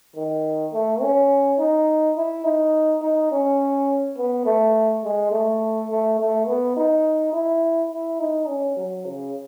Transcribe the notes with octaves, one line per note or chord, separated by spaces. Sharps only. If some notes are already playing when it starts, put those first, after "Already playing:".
D#3
A3
C#4
D#4
E4
D#4
D#4
C#4
B3
A3
G#3
A3
A3
A3
B3
D#4
E4
E4
D#4
C#4
F#3
C#3